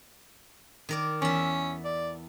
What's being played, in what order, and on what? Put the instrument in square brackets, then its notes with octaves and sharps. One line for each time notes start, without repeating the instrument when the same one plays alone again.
[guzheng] D#3 A#4 D5
[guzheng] E2 E5 [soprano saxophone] C#4
[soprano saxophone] D5